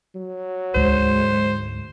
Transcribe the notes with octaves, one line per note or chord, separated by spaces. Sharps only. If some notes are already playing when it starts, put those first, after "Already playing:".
F#3
D2 G#2 G#3 C5